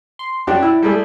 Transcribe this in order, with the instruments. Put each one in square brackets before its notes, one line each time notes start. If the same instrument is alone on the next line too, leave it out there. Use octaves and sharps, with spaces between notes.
[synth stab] C6
[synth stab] F#2 F#3 [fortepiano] D4 F#4 G4
[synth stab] E4
[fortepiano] G3 A3 G#4